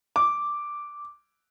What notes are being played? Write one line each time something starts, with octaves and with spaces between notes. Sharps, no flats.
D6